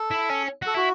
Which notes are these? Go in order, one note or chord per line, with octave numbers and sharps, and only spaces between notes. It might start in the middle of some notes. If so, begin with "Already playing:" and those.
Already playing: A4
E4
C#4
F#4 A4
E4 F#4